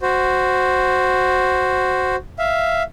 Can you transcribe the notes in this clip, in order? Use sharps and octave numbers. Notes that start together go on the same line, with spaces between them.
F#4 C5
E5 F5